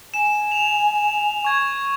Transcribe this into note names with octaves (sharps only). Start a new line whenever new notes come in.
G#5 E7
F7
C#6 G#6